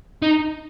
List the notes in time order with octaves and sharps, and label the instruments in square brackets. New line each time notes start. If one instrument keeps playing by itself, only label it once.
[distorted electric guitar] D#4